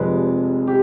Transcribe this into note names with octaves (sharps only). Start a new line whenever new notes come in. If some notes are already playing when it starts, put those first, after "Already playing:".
Already playing: F1 F2 C3 F3 G#3 B4
G4